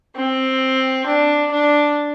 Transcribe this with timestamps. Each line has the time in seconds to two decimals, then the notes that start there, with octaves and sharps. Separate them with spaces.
0.16 C4
1.07 D4
1.51 D4